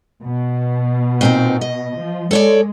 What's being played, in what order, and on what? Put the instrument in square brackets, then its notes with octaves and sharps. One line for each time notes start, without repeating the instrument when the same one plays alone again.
[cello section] B2
[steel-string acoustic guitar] A#2 C4 D#4
D#5
[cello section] F3
[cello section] G#3 [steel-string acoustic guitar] A4 C#5 D5